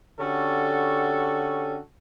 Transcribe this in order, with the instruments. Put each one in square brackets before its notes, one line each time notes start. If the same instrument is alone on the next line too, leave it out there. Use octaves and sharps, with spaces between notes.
[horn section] D3 C#4 F#4 G4 A4